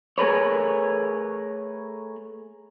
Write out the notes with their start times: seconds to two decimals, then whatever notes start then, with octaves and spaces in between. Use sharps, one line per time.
0.18 A3 G#4 A#4 B4 C#5